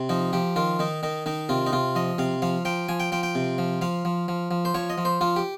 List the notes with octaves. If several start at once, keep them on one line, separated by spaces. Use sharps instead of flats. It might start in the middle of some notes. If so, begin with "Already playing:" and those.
Already playing: C3
F3 D#4
F3 G4
D#3 F4
D#3 D#4
D#3 D#4
D#3 D#4
C3 F4
D#4
C3 F4
F3 D#5
C3 F5
F3 F5
F3 G5
F3 G#5
G5
F3 G5
G5
C3
F3
F3 F5
F3
F3
F3
C5
F3 C#5
D#5
F3
C5
F3 F4
G4